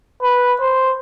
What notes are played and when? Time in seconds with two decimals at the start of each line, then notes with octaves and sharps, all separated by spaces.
0.22 B4
0.61 C5